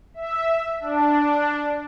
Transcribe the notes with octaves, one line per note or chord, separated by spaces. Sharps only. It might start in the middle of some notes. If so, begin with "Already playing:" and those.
E5
D4